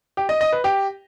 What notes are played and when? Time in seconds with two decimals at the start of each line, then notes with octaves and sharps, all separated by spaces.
0.17 G4
0.29 D#5
0.41 D#5
0.52 B4
0.64 G4